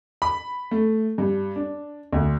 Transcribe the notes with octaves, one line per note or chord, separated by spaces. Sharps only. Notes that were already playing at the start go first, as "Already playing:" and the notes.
B5
A3
G2
D4
D2